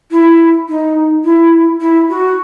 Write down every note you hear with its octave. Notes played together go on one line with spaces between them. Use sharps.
E4
D#4
E4
E4
F#4